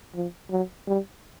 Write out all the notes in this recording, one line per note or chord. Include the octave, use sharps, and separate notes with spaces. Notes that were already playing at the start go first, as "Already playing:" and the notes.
F3
F#3
G3